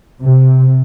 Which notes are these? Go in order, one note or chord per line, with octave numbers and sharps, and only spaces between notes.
C3